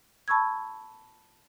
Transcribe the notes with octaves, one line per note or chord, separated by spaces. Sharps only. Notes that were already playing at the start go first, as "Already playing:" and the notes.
A5 B5 C#6 E6 G#6